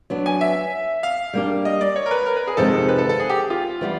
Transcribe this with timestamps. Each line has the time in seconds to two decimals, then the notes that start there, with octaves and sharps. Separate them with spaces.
0.10 F#3 B3 D4
0.26 G#5
0.41 E5
1.03 F5
1.33 G3 A#3 D4 G4
1.65 D#5
1.81 D5
1.96 C#5
2.06 A#4
2.11 B4
2.26 A#4
2.37 B4
2.47 G#4
2.57 F2 C3 D#3 G#3 C4 A4
2.88 B4
2.98 A4
3.09 A4
3.20 G#4
3.29 G4
3.50 F4
3.81 E3 G3 B3